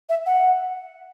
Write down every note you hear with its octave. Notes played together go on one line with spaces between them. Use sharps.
E5
F#5